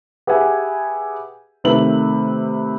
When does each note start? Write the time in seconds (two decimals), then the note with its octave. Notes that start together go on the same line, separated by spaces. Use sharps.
0.27 G4 G#4 B4 E5 F#5 G#5
1.64 C3 D#3 A3 B4 E5 F#7